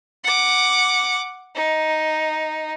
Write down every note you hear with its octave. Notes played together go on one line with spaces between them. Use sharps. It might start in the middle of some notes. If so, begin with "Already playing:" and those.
F#5 D6
D#4